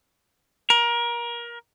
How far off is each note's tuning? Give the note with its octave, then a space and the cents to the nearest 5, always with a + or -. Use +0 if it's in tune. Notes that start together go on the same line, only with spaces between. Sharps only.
A#4 +25